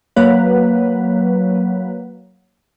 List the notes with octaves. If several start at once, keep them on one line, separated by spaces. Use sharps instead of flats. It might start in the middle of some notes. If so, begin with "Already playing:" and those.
F#3 A#3 B4